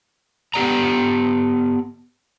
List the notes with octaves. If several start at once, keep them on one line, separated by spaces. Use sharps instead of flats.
B3 G4 D5 A#5